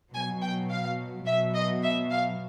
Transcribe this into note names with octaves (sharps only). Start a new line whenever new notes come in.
B2 F#3 G#5
G5
F5
B2 F#3 E5
D#5
E5
F5